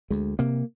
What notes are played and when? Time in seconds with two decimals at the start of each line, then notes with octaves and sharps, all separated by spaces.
0.10 D2 G#3
0.39 C3 A#3